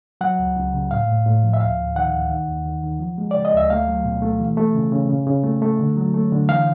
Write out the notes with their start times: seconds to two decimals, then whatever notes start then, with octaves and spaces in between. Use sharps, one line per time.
0.21 F#3 F#5
0.39 C#2
0.56 C#2
0.74 C#3
0.91 A2 F5
1.08 A2
1.26 A2
1.43 F3
1.53 E5
1.60 D2 F5
1.78 D2
1.96 D#3 F#5
2.13 D2
2.31 D#3
2.48 D#2
2.65 D#3
2.83 D#3
3.00 F3
3.18 G#3
3.31 C#3 D5
3.45 D#5
3.53 D2 E5
3.70 A3 F5
3.88 F#3
4.05 B2
4.22 A3
4.40 E3
4.57 A3
4.75 C#3
4.92 C#3
5.10 C#3
5.27 C#3
5.44 A3
5.62 A3
5.80 D3
5.97 F#3
6.14 A3
6.32 D3
6.49 E3 F5